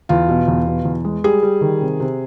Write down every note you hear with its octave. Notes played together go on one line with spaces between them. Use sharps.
E2 F4
B2
E2
B2
E2
G#3
G3 G#4
G3
D#3
C3
C3